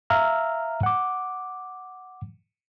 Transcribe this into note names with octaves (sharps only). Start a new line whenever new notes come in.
E5 F5 A#5 E6 F6
F#5 D6